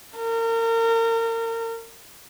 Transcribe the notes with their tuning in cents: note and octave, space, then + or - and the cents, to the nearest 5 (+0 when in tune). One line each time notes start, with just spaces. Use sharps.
A#4 -35